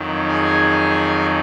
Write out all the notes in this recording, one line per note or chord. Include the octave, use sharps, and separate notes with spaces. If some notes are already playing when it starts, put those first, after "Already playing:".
Already playing: F2 D#3 F#3
G#4 G#5